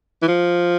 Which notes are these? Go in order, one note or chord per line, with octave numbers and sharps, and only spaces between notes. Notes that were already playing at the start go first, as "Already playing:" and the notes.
E3
F3